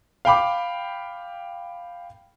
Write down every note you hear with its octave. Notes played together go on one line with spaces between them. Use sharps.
F5 G5 B5 D6